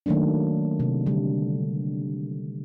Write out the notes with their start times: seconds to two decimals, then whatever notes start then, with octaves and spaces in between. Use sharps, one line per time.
0.06 D#3 F#3 A3 A#3 D4
0.80 C3
1.06 D3 G3